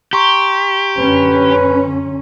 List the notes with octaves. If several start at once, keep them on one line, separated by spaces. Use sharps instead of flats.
G4 A#5 C6 C#6
F#2 D3 C#4 B4